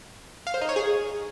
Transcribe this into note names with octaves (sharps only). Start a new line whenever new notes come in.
F5
C5
D#4
C#5
G#4